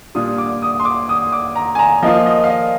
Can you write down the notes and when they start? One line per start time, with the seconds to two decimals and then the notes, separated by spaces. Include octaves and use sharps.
0.15 A#2 G3 D4 F4 D#6
0.38 D6
0.62 D#6
0.80 C6
0.85 D6
1.09 D#6
1.32 D6
1.56 A#5
1.75 G#5
1.79 A#5
2.03 F3 A#3 F4 D#5
2.26 D#5
2.44 F5
2.50 D#5